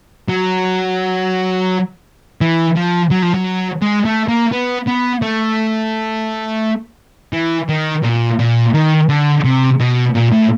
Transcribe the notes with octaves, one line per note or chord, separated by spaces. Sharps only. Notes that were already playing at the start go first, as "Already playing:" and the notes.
F#3
E3
F3
F#3
F3
F#3
G#3
A3
A#3
B3
B3
A3
E3
D#3
A#2
A#2
D#3
D3
C3
B2
A#2
A2